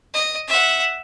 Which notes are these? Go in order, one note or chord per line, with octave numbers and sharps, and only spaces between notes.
D#5
E5 F#5